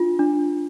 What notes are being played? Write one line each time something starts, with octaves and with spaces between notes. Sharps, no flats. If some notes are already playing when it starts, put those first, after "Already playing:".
Already playing: D4 F4
D4